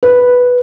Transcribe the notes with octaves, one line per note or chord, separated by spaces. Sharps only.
B4